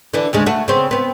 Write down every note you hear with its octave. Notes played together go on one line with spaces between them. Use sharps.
D3 E3 D4
D2 C#3 G#3
A3 F#4
C#3 B3 C4
B3 C4